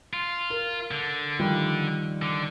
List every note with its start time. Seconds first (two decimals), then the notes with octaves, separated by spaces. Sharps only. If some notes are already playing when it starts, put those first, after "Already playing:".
0.13 F4
0.50 A#4
0.91 D3
1.39 D#3 F3 G3
2.22 D3